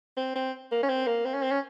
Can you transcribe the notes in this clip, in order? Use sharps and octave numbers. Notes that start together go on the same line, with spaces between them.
C4
C4
A#3
C#4
C4
A#3
C4
C#4
C4
C#4